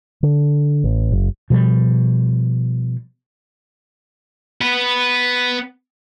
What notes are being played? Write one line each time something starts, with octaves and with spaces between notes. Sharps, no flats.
D3
A1
F#1
B2 F3 G3
B3 B4